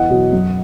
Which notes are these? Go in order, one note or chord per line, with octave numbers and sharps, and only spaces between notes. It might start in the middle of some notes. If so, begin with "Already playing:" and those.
Already playing: E2 D#5 F#5
B2 F#3
F#2